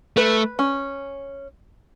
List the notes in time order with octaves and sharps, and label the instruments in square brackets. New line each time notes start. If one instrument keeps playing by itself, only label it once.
[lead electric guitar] A3 [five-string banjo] B4
[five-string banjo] C#4